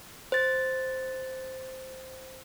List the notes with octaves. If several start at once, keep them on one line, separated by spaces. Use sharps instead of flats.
C5 A6